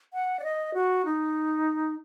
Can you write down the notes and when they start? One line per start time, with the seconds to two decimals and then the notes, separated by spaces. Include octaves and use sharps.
0.13 F#5
0.39 D5
0.44 D#5
0.74 F#4
1.05 D#4